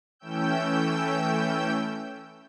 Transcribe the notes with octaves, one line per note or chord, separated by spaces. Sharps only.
E3 A3 C#4 G5 E6 G6